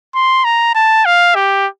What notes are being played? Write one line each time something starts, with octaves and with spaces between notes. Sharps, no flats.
C6
A#5
A5
F5
G4